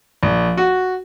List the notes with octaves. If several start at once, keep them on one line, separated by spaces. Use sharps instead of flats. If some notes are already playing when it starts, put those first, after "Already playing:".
A#1
F#4